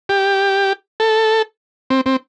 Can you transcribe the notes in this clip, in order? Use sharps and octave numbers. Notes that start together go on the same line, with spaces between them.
G4
A4
C4
C4